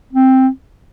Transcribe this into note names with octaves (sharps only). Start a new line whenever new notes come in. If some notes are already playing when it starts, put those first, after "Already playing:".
C4